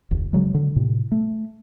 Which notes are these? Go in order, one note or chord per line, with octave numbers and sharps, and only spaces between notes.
F1 D2
C#3 F#3 G#3
D3
A2 C3
A3